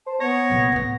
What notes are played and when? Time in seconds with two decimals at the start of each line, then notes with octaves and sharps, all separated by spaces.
0.06 C5 A5
0.20 B3 C#5 A#6
0.50 C2 A#2
0.72 A2 A3